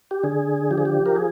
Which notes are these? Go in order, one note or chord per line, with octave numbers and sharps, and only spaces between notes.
G4
D3 G#4
F3 G4
G#4
G4
A#4
G#4